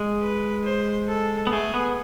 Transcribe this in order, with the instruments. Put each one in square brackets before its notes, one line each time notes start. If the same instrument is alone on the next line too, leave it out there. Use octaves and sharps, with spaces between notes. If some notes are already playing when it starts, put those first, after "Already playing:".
Already playing: [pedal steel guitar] G#3
[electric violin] B4
C5
A4
[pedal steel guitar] B3
[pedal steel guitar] A3 [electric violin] G#4
[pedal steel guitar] B3